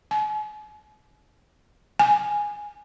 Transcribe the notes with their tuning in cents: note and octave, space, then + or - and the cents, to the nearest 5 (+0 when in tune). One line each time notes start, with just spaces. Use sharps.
G#5 +40
G#5 +0